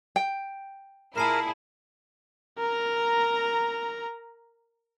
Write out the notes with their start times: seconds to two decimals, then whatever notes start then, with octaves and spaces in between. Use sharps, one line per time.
0.16 G5
1.16 A#2 E4 G#4 A#4 A5 C7 E7
2.59 A#4 A#5